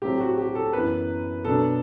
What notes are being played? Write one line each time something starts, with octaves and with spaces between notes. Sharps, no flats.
A2 F#3 A3 C4 G4
F#4
G4
A4
F#2 E3 B3 B4
B2 F#3 B3 D4 A4